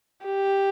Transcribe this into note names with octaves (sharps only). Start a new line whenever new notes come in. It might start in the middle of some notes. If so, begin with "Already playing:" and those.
G4